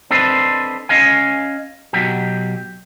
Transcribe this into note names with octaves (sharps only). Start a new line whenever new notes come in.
C4 D4 A4 B4 C5 D#5
C#4 D#5 F5 G#5
B2 F#3 G4